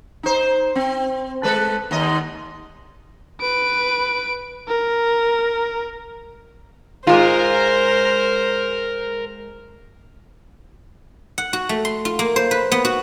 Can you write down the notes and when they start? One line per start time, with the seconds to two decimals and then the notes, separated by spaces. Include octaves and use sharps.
0.23 D#4 C5
0.75 C4
1.43 G#3 A4 B4
1.91 D#2 D#5
3.41 B4 D7
4.68 A#4
7.07 G#2 G#3 F4 A#4 C5 A#5
11.38 F#5
11.53 F#4
11.69 A3
11.85 C6
12.05 F4
12.19 A#3
12.36 C5
12.51 B4
12.72 B3
12.85 F#4